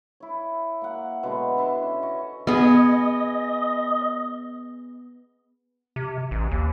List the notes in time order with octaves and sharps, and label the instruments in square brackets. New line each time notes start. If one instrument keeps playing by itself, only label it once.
[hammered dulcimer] E4 C#5
A#3 F#5
B2 D3 G#3
D4 E4 A5 C6
C#4
D#5 C#6
[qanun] B3 G#4 [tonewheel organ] D#5
[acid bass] C3
A1
D#2